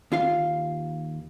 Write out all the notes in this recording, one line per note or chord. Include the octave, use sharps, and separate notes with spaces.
D#2 F4 F5